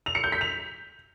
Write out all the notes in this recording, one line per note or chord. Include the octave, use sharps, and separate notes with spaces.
F7
C#7
G6
B6
F7